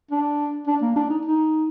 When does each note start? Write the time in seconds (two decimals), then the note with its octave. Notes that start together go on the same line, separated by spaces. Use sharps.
0.11 D4
0.67 D4
0.82 A#3
0.96 D4
1.10 D#4
1.25 D#4